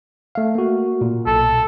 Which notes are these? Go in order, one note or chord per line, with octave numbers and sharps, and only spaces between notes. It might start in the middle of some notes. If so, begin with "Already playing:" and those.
A3 F5
A#3 F#4
A#2
B1 A4